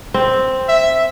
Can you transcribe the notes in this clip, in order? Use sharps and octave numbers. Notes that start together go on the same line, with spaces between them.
C4
E5